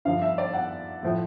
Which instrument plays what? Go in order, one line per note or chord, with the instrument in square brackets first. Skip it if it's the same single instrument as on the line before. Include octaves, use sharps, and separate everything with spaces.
[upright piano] G2 D3 F3 F5
E5
D5
F#5
A2 F3